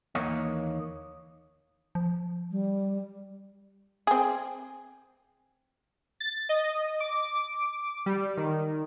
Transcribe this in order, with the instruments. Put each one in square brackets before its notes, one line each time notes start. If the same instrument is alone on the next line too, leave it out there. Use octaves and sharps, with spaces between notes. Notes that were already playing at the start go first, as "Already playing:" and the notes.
[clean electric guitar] D#2 E3 A#3 C#5 D#5
[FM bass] F3
[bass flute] G3
[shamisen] C4 G#4
[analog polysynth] A6
D#5
D6
G3
D#3